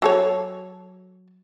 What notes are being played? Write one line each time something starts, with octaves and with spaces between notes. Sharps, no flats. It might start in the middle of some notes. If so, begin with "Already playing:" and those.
F#3 A4 C#5